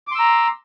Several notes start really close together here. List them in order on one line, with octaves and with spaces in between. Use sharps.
D6 C6 E6 A#5